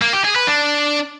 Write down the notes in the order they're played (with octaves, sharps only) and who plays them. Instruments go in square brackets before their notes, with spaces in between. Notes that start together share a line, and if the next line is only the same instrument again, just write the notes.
[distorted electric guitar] A#3
G4
G#4
B4
D4